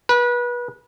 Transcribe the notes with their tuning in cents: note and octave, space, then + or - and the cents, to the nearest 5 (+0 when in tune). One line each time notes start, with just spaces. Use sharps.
B4 -30